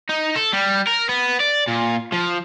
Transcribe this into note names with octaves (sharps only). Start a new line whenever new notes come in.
D#4
A4
G3
A#4
B3
D5
A#2
F3